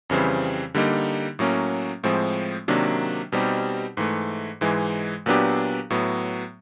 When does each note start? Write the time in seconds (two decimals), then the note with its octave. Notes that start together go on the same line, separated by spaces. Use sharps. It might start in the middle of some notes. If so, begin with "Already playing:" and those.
0.10 F2 C#3 E3 G3 C4
0.74 D3 G3 A#3 D#4
1.39 A2 F#3 A#3 C#4
2.04 A2 F3 G#3 C4
2.68 C3 D#3 F#3 A#3 D4
3.32 B2 G3 C4 D#4 G4
3.97 G#2 E3 A3
4.61 G#2 E3 G#3
5.26 A#2 F#3 B3 D4 G4
5.90 A2 F#3 B3